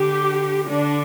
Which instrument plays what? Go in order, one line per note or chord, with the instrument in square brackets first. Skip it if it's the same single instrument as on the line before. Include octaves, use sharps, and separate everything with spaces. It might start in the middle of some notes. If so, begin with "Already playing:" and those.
Already playing: [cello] D3 [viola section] G4
[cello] D3 [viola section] D4